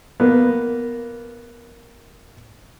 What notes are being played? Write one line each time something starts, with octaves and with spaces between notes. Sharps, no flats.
A#3 B3